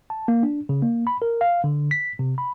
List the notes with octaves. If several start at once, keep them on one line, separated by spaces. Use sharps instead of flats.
A5
A#3
D4
C#3
A#3
B5
A#4
F5
D3
B6
C3
B5